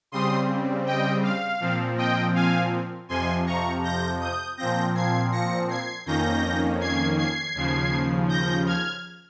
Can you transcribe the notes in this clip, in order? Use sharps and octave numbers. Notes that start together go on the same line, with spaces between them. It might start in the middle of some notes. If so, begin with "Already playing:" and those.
C#3 G3 C4 C6 D#6
D#5 G5
F5
A#2 F3 C4
D#5 G5
F5 G#5
F2 C3 F3 G#5 C6
A#5 C#6
G6 A#6
D#6 G6
A#2 F3 C4 G6 A#6
G#6 C7
A#6 C#7
G#6 C7
F2 D#3 A#3 C#4 G6 A#6
G#6 C7
G#6 C7
D#2 C#3 F3
G6 A#6
F6 G#6